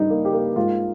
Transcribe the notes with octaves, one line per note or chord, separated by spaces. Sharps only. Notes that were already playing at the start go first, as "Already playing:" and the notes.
Already playing: G2 D#4
A#3
G4
A#3
G#2 F4